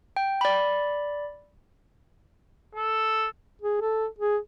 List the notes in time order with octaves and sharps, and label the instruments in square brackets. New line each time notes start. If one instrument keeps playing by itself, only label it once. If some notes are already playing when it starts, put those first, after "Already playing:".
[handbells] G5
D5 B5
[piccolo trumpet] A4
[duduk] G#4
A4
G#4